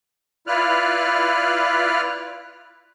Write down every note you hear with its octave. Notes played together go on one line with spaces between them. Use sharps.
E4 F4 B4 D5 F6 F#6